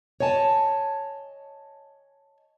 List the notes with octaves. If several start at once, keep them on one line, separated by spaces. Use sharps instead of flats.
C#5 D#5 G#5 A5